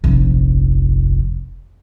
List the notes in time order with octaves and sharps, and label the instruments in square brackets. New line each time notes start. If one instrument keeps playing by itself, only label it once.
[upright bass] F1 A#1